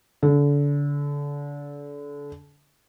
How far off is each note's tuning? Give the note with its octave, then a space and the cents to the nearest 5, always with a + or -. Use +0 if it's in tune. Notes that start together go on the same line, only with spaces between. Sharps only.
D3 -30